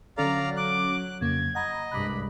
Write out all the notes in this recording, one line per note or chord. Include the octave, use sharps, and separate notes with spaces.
D3 F#3 C#4 A4 D5 F5 A#5
D6 F#6
F2 C#3 A#3 G#6
D#5 F#5 A#5 B5
C2 G2 G#3 B5 D6 F#6